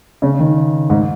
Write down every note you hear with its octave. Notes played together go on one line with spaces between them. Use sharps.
C#3
D#3
G#2